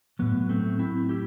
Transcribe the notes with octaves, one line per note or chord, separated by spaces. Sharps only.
A2 F#3 B3
A3 C4
C4 E4
E4 G4